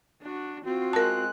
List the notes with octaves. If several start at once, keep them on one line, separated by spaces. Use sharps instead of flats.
D4 F#4
C4 F4 F#4
G#3 A#4 A5 F#6